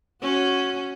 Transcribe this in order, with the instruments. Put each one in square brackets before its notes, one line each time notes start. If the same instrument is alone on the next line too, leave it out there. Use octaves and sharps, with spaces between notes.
[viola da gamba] C#4 F#4